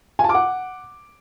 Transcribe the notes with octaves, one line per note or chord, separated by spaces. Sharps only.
G#5
A5
D6
F#5